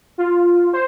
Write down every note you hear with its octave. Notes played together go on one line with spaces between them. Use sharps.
F4
C5